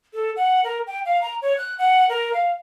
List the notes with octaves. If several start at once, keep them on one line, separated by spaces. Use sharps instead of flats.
A4
F#5
A#4
G5
F5
A#5
C#5
F#6
F#5
A#4
F5